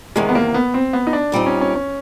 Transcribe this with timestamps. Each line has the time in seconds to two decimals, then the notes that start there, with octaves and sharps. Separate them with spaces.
0.16 E2 C3 D#3 G#3
0.29 B3
0.35 A#3
0.54 B3
0.74 C4
0.93 B3
1.07 D#4
1.13 D4
1.32 A#2 G3 C4 D#4
1.46 C#4
1.61 C#4
1.75 C#4